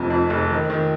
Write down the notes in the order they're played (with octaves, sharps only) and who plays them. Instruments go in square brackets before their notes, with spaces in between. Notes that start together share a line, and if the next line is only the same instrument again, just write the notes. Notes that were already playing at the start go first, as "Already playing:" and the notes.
Already playing: [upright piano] F1 F2
F2
F1
D#3
D#3